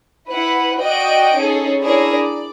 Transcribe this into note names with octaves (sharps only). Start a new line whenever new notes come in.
E4 B4 F#5
F#4 D5 D#5 G5 D7
C#4 D#4 G#4 A4
D4 E4 G#4 A#4 C#5
D5